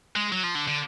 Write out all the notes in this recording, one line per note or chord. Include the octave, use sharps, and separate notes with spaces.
G#3
F#3
F3
D3
D3